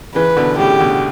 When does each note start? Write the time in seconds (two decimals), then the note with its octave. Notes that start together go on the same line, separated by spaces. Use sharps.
0.15 C#3 E3 B4
0.37 B2 D3
0.58 A2 C#3 G4
0.80 B2 D3